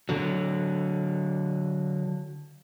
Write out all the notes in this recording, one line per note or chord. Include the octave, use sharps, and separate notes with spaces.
D3 F#3